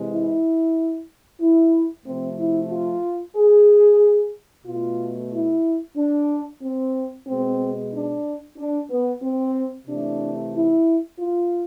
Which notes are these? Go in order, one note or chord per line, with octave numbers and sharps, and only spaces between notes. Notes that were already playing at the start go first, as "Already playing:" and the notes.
Already playing: C3 E3 G#3
E4
E4
C3 F3 A3 C4
E4
F4
G#4
B2 A3 F4
E4
D4
C4
B2 G#3 C4
D4
D4
B3
C4
C3 E3 A3 D4
E4
F4